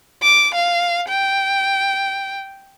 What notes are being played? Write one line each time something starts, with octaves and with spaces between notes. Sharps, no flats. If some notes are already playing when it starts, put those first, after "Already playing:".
D6
F5
G5